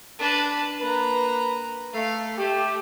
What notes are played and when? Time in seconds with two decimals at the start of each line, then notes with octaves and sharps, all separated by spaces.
0.19 D4 B4
0.81 A#3 B4 A#5
1.94 A3 F5
2.38 A3 G4